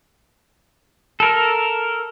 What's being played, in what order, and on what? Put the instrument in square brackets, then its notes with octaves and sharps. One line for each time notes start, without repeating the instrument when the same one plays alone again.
[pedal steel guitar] A4 A#4